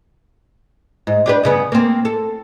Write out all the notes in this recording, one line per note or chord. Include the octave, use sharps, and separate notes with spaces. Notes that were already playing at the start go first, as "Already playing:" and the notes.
G#2
D4 G4 B4
G2 C#3 B3
A#3 C4
A4